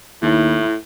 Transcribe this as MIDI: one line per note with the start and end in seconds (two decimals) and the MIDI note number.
0.22 0.62 39
0.22 0.74 45
0.22 0.76 64